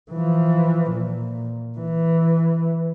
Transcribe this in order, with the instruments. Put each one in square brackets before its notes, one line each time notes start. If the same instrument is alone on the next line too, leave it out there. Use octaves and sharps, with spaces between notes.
[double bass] E3 F3
A#2
E3